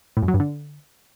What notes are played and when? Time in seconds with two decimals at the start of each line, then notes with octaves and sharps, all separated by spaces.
0.17 A2
0.22 F#2
0.28 F#3
0.34 G2
0.40 D3